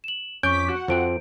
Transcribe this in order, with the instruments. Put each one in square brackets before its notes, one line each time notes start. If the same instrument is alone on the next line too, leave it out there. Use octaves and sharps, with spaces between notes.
[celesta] E7 F#7
[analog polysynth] F2 D6 B6 [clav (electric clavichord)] C#4 [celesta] C#6 D7 [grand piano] G6
[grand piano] F#4 [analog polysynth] F#5
[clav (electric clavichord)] F2 F3 C4 [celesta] C5 D7